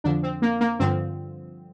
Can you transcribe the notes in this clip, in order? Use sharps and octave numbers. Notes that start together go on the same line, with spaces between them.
F2 D3 F3 D4
C4
A#3
A#3
G2 D3 F3 C4